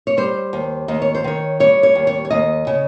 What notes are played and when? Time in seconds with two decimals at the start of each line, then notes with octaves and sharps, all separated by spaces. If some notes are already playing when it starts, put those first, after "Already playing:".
0.07 C#5
0.17 G3 C5
0.53 D#2
0.88 D#2 D#5
1.02 C#5
1.15 C5
1.24 D#3 C#5
1.60 G3 C#5
1.83 C#5
1.95 D#2
2.07 C#5
2.25 C#5
2.30 D#2 D#5
2.67 C#3